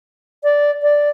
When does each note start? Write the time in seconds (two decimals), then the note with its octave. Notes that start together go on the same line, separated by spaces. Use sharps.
0.43 D5
0.82 D5